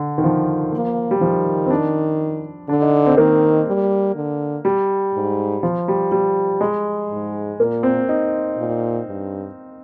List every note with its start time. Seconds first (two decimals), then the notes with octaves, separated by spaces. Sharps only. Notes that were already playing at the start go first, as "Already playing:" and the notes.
Already playing: D3
0.18 D#3
0.24 F3
0.73 A#3
1.11 G3
1.21 D#3 F3
1.66 C4
1.70 D4
2.69 D3 D4
2.82 D#4
3.06 C4
3.17 D#3 A#3
3.68 G3
4.15 D3
4.65 G3
5.14 G#2
5.63 F3
5.88 G3
6.12 G3
6.61 G#3
7.10 G#2
7.59 A#2 A#3
7.83 C4
8.09 D#4
8.57 A#2
9.07 G2